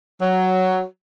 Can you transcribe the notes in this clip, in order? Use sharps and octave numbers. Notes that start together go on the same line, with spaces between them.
F#3